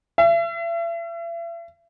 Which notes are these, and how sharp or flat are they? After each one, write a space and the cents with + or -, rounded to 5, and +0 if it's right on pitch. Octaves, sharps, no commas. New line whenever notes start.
E5 +40